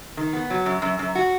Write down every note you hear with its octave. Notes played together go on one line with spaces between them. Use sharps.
D#3
B3
F#3
F#2
F#2
F#2
F#4